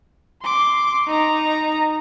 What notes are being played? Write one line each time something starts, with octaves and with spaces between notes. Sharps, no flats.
C6 D6
D#4 A#5